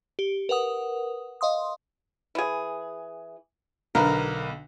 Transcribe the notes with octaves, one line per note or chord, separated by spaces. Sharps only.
G4
A#4 B4 F#5 D#6
D#5 F5 C6 D#6
E3 G#4
B1 D3 A#4 B4